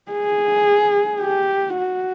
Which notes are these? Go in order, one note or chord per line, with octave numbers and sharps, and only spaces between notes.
G#4
G4
F#4